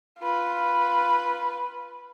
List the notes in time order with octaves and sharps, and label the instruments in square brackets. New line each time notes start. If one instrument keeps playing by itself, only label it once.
[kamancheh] F4 B4